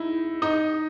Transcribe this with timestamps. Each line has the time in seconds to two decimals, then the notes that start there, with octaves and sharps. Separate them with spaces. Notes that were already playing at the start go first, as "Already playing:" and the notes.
Already playing: D#4 E4
0.42 D#4 D#5